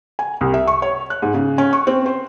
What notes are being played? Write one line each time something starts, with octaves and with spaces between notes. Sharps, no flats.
G#5
C2
E5
C#6
C#5
F#6
G#2
C#3
C#4
C#6
C4
C5